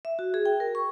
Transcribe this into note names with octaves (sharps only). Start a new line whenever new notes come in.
E5
F#4
G#4
G5
A#4
C#6